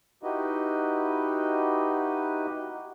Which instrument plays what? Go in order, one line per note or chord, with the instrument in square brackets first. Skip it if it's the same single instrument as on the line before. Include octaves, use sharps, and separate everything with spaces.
[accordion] D#4 E4 F#4 G4 B4 D#5